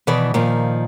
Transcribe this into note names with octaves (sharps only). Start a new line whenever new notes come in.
B2 D#3 E3 D5
A#2 D#3 F3